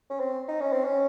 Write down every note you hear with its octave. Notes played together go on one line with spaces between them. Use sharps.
C#4
C4
D#4
C#4
C4
C#4